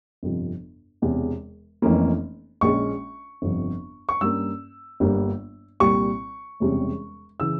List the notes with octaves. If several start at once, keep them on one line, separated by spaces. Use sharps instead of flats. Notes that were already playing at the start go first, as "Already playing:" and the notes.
G1 F2 C3 F3
E1 E2 C3
F1 F2 E3 A#3 C#4
A#1 A#2 G#3 C#4 C#6
G1 F2 C3 F3
C#6
G2 G3 A#3 C#4 E6
G1 G2 G3 A#3
C2 A#2 G3 C#6
E1 E2 C3 G3 C#4
C#3 E3 E6